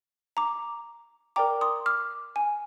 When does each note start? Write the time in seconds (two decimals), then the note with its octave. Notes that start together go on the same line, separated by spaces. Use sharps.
0.37 A#5 D6
1.36 A#4 D5 G5 A#5 D6
1.61 C6 D#6
1.86 D6 F6
2.36 G#5